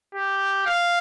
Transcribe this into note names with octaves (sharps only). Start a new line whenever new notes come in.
G4
F5